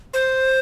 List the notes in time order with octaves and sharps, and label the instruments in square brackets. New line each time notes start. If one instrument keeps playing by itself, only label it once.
[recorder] C5